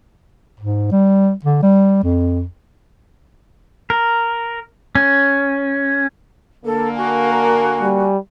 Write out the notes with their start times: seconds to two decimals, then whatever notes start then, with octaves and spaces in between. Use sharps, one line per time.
0.60 G#2
0.92 G3
1.45 D3
1.63 G3
2.03 F2
3.90 A#4
4.95 C#4
6.65 D3 A#3 A4
6.96 F#4 G#5
7.31 A#4
7.82 G3